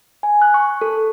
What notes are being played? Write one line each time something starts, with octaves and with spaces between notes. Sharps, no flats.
G#5
F#6
C#6
A4